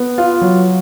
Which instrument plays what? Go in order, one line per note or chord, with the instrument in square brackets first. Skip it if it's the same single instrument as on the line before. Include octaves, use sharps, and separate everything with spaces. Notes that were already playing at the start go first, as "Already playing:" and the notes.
Already playing: [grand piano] B3
F4
F#3